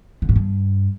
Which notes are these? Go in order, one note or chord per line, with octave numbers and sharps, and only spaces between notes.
D3
G#2
G2